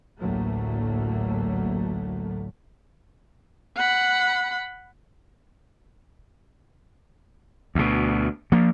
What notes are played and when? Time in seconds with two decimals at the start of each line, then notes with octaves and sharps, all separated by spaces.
0.18 A1 D2 A2 F#3 A3 A#3
3.77 F#5 B5
7.75 D2 B2
8.52 F3 A#3